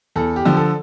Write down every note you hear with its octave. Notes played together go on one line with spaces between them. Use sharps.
E2 A4
G4
D3 F3
A4